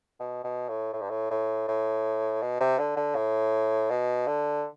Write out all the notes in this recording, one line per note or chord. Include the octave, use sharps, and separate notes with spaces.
B2
B2
A2
A2
G2
A2
A2
A2
B2
C3
D3
D3
A2
B2
D3